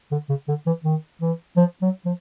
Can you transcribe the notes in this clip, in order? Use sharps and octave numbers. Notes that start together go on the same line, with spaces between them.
D3
C#3
D3
E3
D#3
E3
F3
F#3
F3